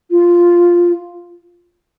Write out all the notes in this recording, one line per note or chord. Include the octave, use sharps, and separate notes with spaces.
F4